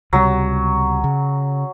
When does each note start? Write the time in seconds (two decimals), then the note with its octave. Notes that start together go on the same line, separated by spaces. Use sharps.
0.13 C#2 C3 F#3 G3
1.04 C#3